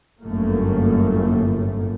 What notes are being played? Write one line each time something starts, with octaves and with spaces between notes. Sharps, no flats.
G1 F#2 A2 A3 A#3